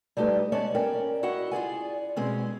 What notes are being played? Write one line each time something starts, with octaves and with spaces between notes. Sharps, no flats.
G3 A3 D#4 G4 B4
G#3 B3 C#4 C#5 D5 A5
C#4 A#4 D5 G5
E4 F#4 D#5 F#5
F4 G#4 D5 G#5
B2 G#3 C4 C#4